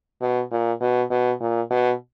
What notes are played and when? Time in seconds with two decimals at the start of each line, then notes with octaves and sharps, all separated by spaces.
0.21 B2
0.51 A#2
0.81 B2
1.11 B2
1.40 A#2
1.70 B2